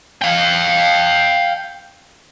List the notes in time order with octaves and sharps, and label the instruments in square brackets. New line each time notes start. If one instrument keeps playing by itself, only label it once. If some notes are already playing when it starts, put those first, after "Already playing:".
[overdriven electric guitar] F5 G5